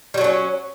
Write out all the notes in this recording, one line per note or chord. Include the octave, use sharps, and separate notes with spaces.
F#3 G3 A3 C#4